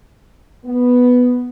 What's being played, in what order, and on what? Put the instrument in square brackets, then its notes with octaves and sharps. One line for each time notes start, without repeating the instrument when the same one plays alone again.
[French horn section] B3